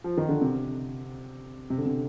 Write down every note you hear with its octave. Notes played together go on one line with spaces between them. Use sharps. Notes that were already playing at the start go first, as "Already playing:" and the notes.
F3
D#3
D3
C3
C3
D3
C3